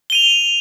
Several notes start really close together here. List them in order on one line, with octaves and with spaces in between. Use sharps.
G7 D#7 F7